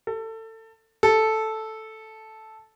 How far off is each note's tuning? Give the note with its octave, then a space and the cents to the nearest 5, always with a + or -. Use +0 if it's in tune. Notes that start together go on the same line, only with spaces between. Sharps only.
A4 +25
A4 -5